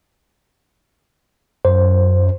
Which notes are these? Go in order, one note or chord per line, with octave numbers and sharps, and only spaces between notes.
F#2 C5